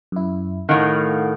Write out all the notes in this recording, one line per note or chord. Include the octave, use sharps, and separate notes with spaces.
F#2 E4
A2 D#3 A3 F5 F#5